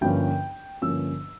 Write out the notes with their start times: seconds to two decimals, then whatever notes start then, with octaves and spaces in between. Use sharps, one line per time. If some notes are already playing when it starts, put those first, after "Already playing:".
0.01 G1 G2 F3 A#3 C#4 G5
0.82 G1 G2 F3 A#3 C#4 E6